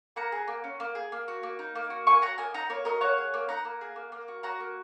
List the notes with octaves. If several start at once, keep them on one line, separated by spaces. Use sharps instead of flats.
A#3 F#5 A#5
G#4
A#3
C#4
A#3
G#4
A#3
F#4
A#3
D#4
A#3
F#4
A#3 G#5 C#6
F#4 F#5 A#5
A#3 D#5 G#5
D#4 F#5 A#5
A#3 C#5
F#4 A#4 D#5
A#3 C#5 F#5
G#4
A#3
D#4 F#5 A#5
A#3
G#4
A#3
A#3
F#4
F#4 F#5 A#5
A#3